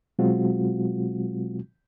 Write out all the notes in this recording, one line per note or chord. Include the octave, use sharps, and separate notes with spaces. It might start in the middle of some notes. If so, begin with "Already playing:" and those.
B2 F#3 G#3 C4 F4 F#4